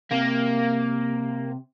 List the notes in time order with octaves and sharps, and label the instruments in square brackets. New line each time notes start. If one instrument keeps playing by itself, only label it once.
[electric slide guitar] C3 [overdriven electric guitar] A#3